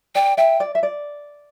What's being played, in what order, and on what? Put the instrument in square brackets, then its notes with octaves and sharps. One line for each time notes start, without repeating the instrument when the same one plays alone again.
[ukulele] D5 [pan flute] G5
[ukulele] E5 [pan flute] G5
[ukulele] D5
E5
D5